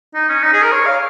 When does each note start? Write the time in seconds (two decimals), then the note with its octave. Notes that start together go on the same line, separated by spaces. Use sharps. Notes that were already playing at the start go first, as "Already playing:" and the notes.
0.14 D#4
0.29 C#4
0.43 D#4
0.52 G#4
0.62 A#4
0.72 C#5
0.86 F5